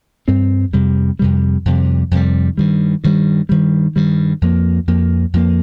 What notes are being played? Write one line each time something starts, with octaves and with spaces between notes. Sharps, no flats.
G2 G3 C4
F2 C3 G3
F2 C3 G3
F2 C3 G3
F2 C3 G3
G2 D#3 G3
G2 D#3 G3
G2 D#3 G3
G2 D#3 G3
F2 F3 A#3
F2 F3 A#3
F2 F3 A#3